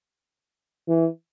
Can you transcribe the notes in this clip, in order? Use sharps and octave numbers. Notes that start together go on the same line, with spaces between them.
E3